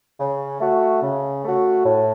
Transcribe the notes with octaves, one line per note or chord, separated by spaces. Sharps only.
C#3
A3 F#4
C#3
A3 F#4
A2